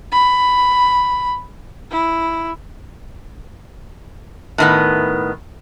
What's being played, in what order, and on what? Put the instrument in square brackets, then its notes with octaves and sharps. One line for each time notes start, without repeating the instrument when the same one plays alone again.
[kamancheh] B5
E4
[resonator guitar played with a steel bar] A2 D#3 B3